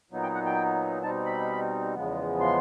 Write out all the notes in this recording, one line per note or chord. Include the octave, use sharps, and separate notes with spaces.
A#2 F#3 B3 D#4
G5
F#5
G5
B2 G3 C4 D#4 A5
B5
E2 C#3 F3 G#3 B3
C6